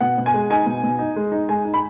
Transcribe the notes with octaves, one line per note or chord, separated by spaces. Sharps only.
B2 F#5
B2
G#5
G#3
D#4 G#5
B2
B2
D#4
G#3
D#4
G#3 G#5
D#4
B5